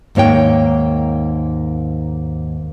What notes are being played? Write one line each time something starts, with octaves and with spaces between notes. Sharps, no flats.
D#2 G#2 A#3 C#5 G5